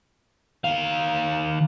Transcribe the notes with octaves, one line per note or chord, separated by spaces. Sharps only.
D#3 F5